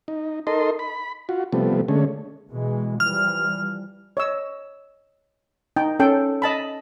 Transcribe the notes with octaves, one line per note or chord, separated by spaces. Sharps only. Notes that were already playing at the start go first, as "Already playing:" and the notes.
D#4
D#4 A4 A#4 D#5 C6
B5
F4 F#4
C3 F3 G3 A3 B3
D3 G#3 A3 C#4
B2 E3 G#3
E3 F3 G3 F6
C#5 D#5 E6
D#4 G5
C#4 A4 G5
D#5 A5 B5